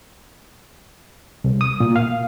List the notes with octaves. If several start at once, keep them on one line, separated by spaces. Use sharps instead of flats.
C2
D#6
A#2
F5